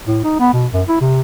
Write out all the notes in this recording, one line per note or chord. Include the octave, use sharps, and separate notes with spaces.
A2
D#4
B3
B2
F#2
E4
C3